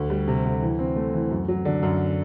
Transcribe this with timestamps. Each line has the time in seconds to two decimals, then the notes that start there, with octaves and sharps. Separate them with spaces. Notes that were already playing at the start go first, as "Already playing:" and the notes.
Already playing: D2
0.10 G3
0.28 C3
0.45 D2
0.62 E3
0.79 C4
0.96 A3
1.13 E3
1.31 F#2
1.48 F#3
1.65 D3
1.83 F#2